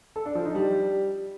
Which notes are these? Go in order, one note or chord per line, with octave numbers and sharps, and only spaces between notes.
A4
D4
F3
D#4
G3